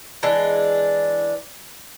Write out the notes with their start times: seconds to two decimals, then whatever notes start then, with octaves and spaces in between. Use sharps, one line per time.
0.23 E3 G#3 D4